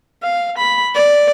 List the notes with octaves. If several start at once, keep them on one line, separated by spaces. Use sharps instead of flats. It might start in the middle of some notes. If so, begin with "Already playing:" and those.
F5
B5
D5